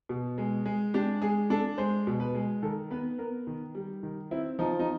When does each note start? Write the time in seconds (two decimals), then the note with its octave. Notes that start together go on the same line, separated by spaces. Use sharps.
0.09 B2
0.38 G#3
0.66 G#3
0.94 D4 G4
1.22 G#3 G#4
1.50 D4 A4
1.78 G#3 C5
2.07 B2
2.20 B4
2.35 G#3
2.62 D#3 A4
2.91 B3 B4
3.18 B3 A#4
3.47 D#3
3.75 G3
4.03 D#3
4.31 C4 E4
4.59 F3 D#4
4.79 D#4